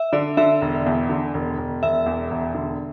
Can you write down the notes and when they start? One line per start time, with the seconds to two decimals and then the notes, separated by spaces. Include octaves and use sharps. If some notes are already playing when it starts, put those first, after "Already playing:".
Already playing: E5
0.13 D3 D5
0.37 D3 E5
0.61 E1
0.86 E2
1.09 D3
1.34 E1
1.58 E1
1.83 E1 E5
2.06 E2
2.31 E1
2.55 D3